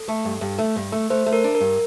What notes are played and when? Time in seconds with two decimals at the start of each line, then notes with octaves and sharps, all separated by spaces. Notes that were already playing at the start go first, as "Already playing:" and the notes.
Already playing: A4
0.08 A3
0.25 G2
0.41 G2
0.59 A3
0.76 G2
0.92 A3
1.10 A3 C5
1.26 A3
1.33 A#4
1.44 D4
1.55 A#4
1.61 G2